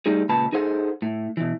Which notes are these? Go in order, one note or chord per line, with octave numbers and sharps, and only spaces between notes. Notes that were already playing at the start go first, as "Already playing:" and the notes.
G3 A3 D#4 G#4
C#2 A#2 B4 A5 B5
D#4 G#4 A4 C5 F#5
A2
B2 E3